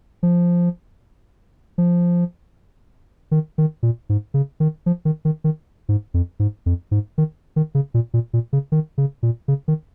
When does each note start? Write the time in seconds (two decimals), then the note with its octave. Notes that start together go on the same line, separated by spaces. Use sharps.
0.23 F3
1.78 F3
3.31 D#3
3.58 D#3
3.83 A#2
4.09 G#2
4.34 C#3
4.60 D#3
4.86 F3
5.05 D#3
5.25 D#3
5.44 D#3
5.89 G#2
6.14 F2
6.39 G#2
6.66 F2
6.91 G#2
7.18 D#3
7.56 D#3
7.75 C#3
7.94 A#2
8.14 A#2
8.33 A#2
8.53 C#3
8.72 D#3
8.98 C#3
9.23 A#2
9.48 C#3
9.68 D#3